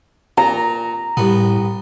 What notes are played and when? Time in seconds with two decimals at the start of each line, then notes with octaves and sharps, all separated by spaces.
0.38 A#2 A#5
1.17 C2 A2 B3